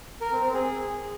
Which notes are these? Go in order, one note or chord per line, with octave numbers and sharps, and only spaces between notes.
A#4
C4
C4
G#4